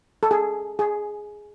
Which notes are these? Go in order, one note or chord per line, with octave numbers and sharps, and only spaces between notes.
A4
G#4
G#4